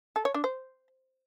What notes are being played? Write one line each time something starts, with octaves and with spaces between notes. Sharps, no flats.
A4
C#5
D4
C5